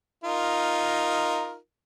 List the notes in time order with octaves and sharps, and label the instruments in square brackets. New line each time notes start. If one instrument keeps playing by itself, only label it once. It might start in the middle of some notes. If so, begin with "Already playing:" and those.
[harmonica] D#4 F4 A#4